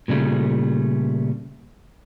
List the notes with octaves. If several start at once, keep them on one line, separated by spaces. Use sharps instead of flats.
A#2 C#3 G3 A3